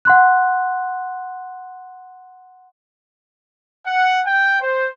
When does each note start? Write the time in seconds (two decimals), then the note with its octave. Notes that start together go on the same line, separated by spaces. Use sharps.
0.05 F#5 C6 F#6
3.86 F#5
4.26 G5
4.60 C5